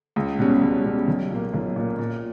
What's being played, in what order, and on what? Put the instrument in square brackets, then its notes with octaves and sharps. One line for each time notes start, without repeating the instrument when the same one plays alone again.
[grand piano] C#2
B2 G3 C#4
C#2
B2 G3 C#4
B1
A#2 A#3
B1
A#2 A#3
A#2